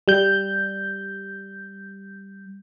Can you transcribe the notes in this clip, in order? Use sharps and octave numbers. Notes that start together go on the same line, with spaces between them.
G3 G6